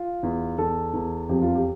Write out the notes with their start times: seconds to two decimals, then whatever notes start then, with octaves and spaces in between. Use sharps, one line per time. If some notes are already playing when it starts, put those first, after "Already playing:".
Already playing: F4
0.23 E2
0.58 E2 A4
0.94 E2
1.29 F2 G4
1.42 F4
1.55 G4